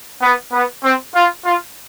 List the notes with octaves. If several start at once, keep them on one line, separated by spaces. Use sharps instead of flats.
B3
B3
C4
F4
F4